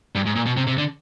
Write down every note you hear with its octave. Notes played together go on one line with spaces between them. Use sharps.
G2
G#2
A#2
B2
C3
C3
D3